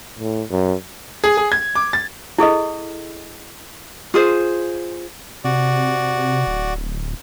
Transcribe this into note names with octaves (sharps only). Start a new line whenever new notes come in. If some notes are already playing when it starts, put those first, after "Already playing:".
A2
F#2
G#4
G#4
G#6
D6
A6
E4 G#4 A4 D#5
F4 G#4 C5
C3 F#4 D5
D1